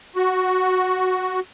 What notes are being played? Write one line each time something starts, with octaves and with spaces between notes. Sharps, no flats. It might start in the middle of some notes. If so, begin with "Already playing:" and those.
F#4